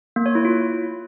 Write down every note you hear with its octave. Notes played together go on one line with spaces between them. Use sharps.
A#3
C#5
E4
F4